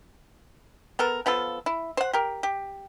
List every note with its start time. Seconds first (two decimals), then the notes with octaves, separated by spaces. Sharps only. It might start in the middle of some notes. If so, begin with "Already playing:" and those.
0.99 B3 A4 A#4
1.26 F3 B3 F4 A4
1.66 E4
1.97 C5 F#5
2.13 G4 A#4
2.43 G4